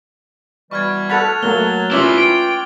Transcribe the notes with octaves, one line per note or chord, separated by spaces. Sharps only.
B2 E3 G3 C#6 F6 G#6
A4 F#5 B5 F#6 A6 F7
F#3 A3 A#3 G7
E3 C#4 E4 F4 G4 E5 D6 F#7
G5